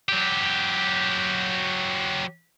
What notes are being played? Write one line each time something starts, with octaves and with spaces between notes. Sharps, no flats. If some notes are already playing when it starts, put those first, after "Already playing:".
F#3 G4